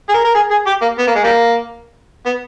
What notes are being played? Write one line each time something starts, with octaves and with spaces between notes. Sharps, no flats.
G#4
A#4
A#4
G#4
G#4
G4
A#3
B3
A#3
G#3
G3 A#3
B3